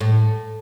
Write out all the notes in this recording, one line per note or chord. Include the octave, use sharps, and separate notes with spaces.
A2